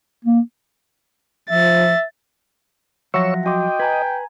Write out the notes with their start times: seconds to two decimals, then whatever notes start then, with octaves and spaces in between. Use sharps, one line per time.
0.25 A#3
1.50 F3 E5 A6
3.14 F3 F#3 C#5 E5 F#5 C#6 E6 A#6
3.46 F#4 D#5 G5 C6 D6
3.80 B4 G#5 A#5 G#6